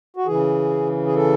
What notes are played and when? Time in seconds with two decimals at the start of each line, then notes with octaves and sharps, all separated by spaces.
0.16 F#4
0.26 C#3 E3 G#4
1.06 G#4
1.15 A4